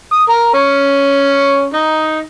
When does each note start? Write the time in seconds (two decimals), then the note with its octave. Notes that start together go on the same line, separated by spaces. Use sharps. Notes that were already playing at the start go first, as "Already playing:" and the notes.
0.12 D#6
0.29 A#4
0.54 C#4
1.74 D#4